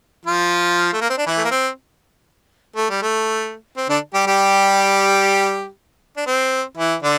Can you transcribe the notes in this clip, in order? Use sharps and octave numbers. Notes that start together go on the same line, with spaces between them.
F3 F4
A3
A#3
C4
D4
E3 E4
A3
A#3
C4
A3
G3
A3
C4
D3 D4
G3 G4
G3 G4
D4
C4
E3 E4
D3 D4